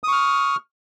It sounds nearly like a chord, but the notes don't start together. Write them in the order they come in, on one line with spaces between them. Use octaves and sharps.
D#6 C#6 F6